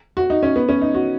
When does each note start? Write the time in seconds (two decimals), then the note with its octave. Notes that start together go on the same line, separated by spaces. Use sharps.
0.17 F#4
0.30 D#4
0.43 C#4
0.56 B3
0.69 C#4
0.81 D#4
0.94 F#4